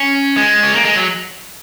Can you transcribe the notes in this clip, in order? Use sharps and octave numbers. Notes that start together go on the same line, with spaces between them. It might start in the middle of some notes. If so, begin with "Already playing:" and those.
Already playing: C#4
G#3
C#4
A#3
G#3
F#3